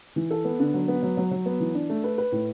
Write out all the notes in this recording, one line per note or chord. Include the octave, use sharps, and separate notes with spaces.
E3
A4
B3
D3
F#3
B3
F#3
F#3
F#3
B3
E3
D4
A3
B4
B4
A2